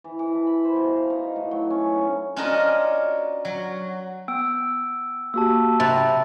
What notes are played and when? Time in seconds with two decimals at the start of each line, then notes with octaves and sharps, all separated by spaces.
0.04 E3
0.19 E3
0.34 A5
0.47 B5
0.65 C5
0.76 B2
0.96 F5
1.10 D#4
1.36 A2
1.51 F#3
1.70 C#4
1.94 B3
2.36 C#4 D4 F4 F#4 A#4 D#5
3.45 F#3
4.28 B3 G5 E6 D7
5.34 A#3 F#4 G4 A5 E6
5.80 C3 A5 B5 F#6 A6